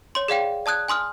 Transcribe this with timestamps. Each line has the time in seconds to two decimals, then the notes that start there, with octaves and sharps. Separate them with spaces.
0.15 C#5 C6
0.28 G#4 D5 F5 G5
0.66 D5 A5 D#6 F#6 G#6
0.89 G#5 C6 D#6 F6